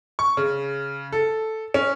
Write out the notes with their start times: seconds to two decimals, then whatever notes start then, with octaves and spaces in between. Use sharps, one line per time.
0.19 C#6
0.37 C#3
1.12 A4
1.74 C#4